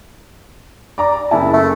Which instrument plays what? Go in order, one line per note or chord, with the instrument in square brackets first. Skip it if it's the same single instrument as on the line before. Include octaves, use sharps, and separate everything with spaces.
[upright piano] D5 A#5 D6
[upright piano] F#1 C#3 A5 [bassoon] E4
[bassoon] A3